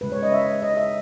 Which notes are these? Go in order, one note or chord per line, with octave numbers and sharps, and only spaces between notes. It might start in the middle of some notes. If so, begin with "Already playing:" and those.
C#3 G#3 B4
C#5
D#5
E5
D#5
E5